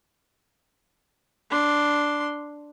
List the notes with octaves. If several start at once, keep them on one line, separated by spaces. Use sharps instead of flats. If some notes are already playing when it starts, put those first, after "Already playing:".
D4 C6